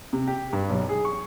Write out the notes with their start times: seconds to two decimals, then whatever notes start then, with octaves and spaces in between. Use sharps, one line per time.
0.13 C3
0.28 G4
0.53 G2
0.69 B1
0.89 G#4
1.05 C#6